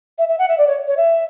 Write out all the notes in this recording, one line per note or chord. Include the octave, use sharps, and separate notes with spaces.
E5
E5
F#5
E5
D5
C#5
C#5
E5